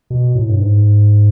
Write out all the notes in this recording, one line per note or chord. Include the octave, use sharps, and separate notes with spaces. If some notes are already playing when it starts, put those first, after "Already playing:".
B2
A2
G2
G#2